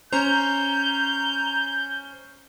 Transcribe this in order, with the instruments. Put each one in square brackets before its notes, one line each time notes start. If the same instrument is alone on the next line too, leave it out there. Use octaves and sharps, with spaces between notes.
[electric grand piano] C#4 C5 [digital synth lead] A#5 [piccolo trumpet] G6